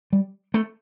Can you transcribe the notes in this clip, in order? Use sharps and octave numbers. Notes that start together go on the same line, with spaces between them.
G3
A3